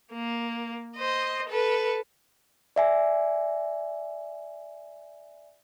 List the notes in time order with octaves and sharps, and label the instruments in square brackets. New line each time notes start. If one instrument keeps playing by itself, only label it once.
[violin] A#3
C5 D#5
A4 B4
[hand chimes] D5 E5 G#5